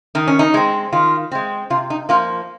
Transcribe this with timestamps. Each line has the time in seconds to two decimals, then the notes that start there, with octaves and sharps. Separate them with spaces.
0.15 D#3 D#4
0.28 C#4
0.39 D#4
0.54 G#3 C4
0.92 D#3 F4
1.32 G#3 C4
1.70 C3 F4
1.90 D#4
2.09 F3 A#3 F4